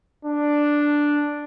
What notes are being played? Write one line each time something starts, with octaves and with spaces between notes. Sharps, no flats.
D4